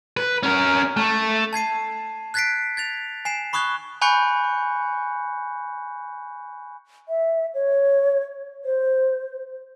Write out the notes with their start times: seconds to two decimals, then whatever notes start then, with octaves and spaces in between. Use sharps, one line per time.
0.17 B4
0.43 C#4 A#4
0.97 A3
1.53 A5 G#6 C7 D#7
2.34 F#6 G#6 A6 B6 C7 D7
2.77 G#6 A6 F7
3.25 G#5 C7 E7
3.53 B5 C#6 D#6 F#6 G#6 G7
4.02 G#5 B5 C#6 F#6 G6 C#7
7.09 E5
7.54 C#5
8.65 C5